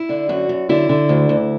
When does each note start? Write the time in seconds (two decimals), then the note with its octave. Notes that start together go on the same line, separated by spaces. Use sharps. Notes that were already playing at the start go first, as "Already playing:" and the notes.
Already playing: E4
0.09 D3
0.29 F#2 F#4
0.49 F#2
0.69 D3 E4
0.89 D3
1.09 D2
1.29 D2